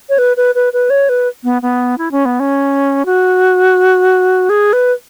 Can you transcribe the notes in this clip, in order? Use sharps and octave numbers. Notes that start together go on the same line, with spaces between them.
C#5
B4
B4
B4
B4
C#5
B4
B3
B3
E4
C#4
B3
C#4
F#4
G#4
B4